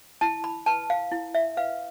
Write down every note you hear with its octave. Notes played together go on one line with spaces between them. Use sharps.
E4 A5
B5
B4 A5
F5
E4
E5
B4 F5